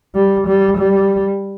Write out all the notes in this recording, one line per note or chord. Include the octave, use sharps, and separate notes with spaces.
G3
G3
G3